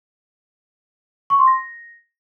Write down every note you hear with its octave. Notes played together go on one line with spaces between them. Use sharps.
C#6
C6
A#6